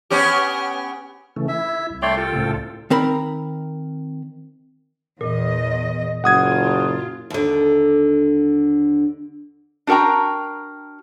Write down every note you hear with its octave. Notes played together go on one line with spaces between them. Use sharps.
B3 C#4 G4
C#3 E3 A3
E4 E5
C2
A3 C#5 D5 G5 C6
F4 A4 G5
C#2 A2
D#3 C4 A#4 B5
E2 A#2 D#5
F#1 F4 F#5 D#6 G#6
D#2 D3
D4 F#4 A#4 G5 A#5